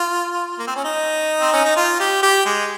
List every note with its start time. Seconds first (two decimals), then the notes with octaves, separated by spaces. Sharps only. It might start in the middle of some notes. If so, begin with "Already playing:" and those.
Already playing: F4
0.59 A#3
0.67 C4
0.76 C#4
0.84 D#4
1.41 C4
1.53 C#4
1.65 D#4
1.76 F4
2.00 G4
2.22 G4
2.45 G#3